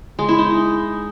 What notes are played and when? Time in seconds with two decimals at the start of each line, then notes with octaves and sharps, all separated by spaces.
0.19 G#3
0.29 E4
0.39 D#4